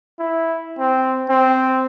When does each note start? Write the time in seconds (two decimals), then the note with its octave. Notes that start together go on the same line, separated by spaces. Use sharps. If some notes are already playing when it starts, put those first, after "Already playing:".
0.19 E4
0.79 C4
1.29 C4